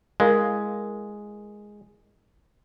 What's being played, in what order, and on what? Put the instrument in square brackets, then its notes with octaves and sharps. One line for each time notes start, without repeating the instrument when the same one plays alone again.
[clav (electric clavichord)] G#3 [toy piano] E4 A#4 F5